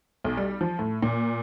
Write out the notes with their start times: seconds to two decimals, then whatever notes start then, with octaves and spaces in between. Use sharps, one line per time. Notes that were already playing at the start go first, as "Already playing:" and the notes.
0.24 B1
0.37 G3
0.61 F3
0.79 A2
1.03 A#2